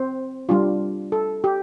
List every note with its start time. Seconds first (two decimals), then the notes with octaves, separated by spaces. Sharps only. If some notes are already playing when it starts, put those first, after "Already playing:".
Already playing: C4 C5
0.49 G3 D4 F4
1.12 A4
1.44 G4